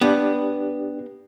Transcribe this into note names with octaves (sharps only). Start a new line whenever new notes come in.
B3 D4 G4